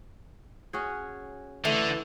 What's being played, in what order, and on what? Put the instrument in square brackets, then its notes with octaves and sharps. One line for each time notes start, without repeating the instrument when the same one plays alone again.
[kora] C#4 F#4 G#4
[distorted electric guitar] D3 [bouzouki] E3 [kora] A3